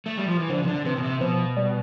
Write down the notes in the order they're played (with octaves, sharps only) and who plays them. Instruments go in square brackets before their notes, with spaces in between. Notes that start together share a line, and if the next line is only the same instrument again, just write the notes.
[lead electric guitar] A3
G3
F3
E3
[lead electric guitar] D3 [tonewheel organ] F3
[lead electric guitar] C3
D3
[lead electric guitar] C3 [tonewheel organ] E3
[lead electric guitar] B2
C3
[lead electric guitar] B2 [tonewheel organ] F3
[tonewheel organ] G3